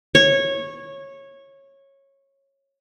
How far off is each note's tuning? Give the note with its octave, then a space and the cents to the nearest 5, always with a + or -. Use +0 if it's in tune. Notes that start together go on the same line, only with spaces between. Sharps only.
C#5 -15